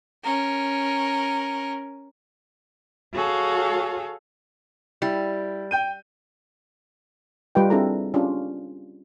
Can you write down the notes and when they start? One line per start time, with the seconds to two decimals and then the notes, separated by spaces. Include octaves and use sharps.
0.23 C#4 A#4
3.13 F#4 G#4 A4 C#5 F5
5.02 G3 E4
5.71 G5 G6 D#7
7.55 G3 F4 G4 B4 D#5 G5
7.70 C4 D4 E4 G#4 A4 A#5
8.14 C#4 D4 F4 G4